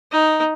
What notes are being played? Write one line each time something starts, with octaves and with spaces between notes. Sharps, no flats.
D#4